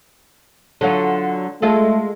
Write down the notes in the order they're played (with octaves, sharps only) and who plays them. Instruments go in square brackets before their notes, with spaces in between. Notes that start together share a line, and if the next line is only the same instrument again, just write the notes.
[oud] D3 F#3 F4
[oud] G#3 F4 A4 [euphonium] A3